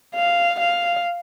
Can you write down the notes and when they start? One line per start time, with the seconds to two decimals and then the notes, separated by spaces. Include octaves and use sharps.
0.15 F5
0.60 F5